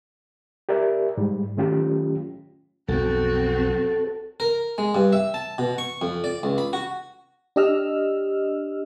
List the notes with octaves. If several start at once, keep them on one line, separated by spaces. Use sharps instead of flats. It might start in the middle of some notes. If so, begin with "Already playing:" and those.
G4 A#4 D5 E5
G#2 G3
D#3 F#3 A3 C#4 F4 G4
B1 F2 C4 F#4 A4
A#4
G#3
G2
E5
A5
B2
C#6
F2
D5
C#2
B5
F#4
D4 G4 D#5 E6 F6